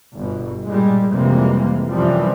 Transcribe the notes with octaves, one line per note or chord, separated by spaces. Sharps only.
G1 B2
A#2 G3 G#3
F2 C3 E3 G3 G#3 A#3
F#2 C3 E3 F3 G3